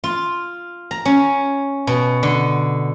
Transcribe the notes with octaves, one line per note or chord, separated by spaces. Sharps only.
F4
A#5
C#4
B2
D3